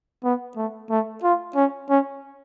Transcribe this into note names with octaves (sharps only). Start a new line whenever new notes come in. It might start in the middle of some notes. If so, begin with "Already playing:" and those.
B3
A3
A3
F4
C#4
C#4